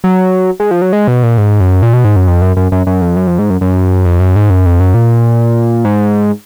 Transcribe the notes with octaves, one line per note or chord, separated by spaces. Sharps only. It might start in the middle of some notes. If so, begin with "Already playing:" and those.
F#3
G#3
F3
F#3
G#3
B2
A#2
G#2
F#2
A#2
B2
G#2
F#2
F2
F#2
F#2
F#2
F#2
F2
F#2
F2
G#2
F#2
F#2
F2
F#2
G#2
F#2
F2
F#2
A#2
G#2